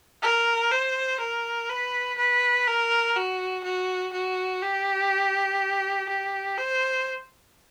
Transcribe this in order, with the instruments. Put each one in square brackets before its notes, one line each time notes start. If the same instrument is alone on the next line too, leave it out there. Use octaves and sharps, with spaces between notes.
[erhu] A#4
C5
A#4
B4
B4
A#4
F#4
F#4
F#4
G4
G4
C5